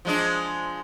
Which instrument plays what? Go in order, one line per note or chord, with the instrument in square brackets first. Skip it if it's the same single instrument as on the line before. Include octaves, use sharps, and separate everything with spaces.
[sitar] F3 G#3 D4